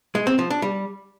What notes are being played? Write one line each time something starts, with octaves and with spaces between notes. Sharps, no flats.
G#3
C4
F3
D4
G3